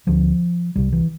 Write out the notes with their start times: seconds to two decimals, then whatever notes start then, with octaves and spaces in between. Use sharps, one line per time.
0.07 D2 D3 F3
0.76 C2 C3 G3
0.93 E3